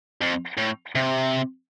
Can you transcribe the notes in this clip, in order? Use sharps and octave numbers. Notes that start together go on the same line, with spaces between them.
F2
A2
C3